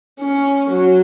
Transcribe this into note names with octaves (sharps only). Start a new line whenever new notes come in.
C#4
F#3